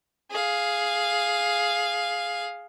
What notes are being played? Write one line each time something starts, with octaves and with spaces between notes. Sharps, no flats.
G#4 F5